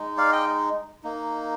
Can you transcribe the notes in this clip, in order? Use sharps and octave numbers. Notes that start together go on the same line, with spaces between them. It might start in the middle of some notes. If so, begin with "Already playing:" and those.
Already playing: G#3 D#4
D5 F5
D#5 G5
A#3 D#4